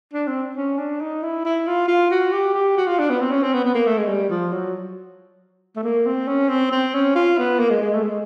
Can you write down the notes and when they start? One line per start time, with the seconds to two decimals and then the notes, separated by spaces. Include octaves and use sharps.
0.13 D4
0.28 C4
0.57 C#4
0.79 D4
1.01 D#4
1.23 E4
1.45 E4
1.67 F4
1.88 F4
2.11 F#4
2.32 G4
2.54 G4
2.77 F#4
2.87 F4
2.99 D4
3.10 B3
3.21 C4
3.32 C#4
3.43 C4
3.53 B3
3.65 B3
3.75 A#3
3.87 A3
3.98 G#3
4.08 G3
4.30 F3
4.52 F#3
5.76 A3
5.83 A#3
6.06 C4
6.28 C#4
6.49 C4
6.72 C4
6.94 C#4
7.16 F4
7.38 B3
7.59 A#3
7.70 G#3
7.82 G#3
7.93 A3
8.03 G#3